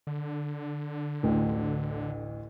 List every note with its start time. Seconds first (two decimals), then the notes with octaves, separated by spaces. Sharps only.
0.07 D3
1.23 A1 D2